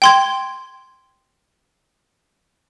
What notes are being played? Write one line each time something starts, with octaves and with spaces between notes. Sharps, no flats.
G5 C6 G#6